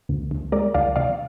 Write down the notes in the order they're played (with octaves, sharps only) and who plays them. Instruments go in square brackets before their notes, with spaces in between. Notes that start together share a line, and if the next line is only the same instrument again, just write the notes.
[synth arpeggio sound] D2
D2
G#3 A#4 D5
D2 D5 F5
C3 D5 F5